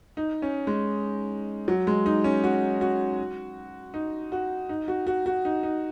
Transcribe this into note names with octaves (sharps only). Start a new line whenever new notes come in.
D#4
C#4
G#3
F#3
G#3
D#4
C#4
F#4
F#4
D#4
F#4
D#4
F#4
F#4
F#4
D#4
D#4